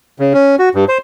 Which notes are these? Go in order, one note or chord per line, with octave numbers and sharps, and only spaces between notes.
C#3
C#4
F#4
G2
C5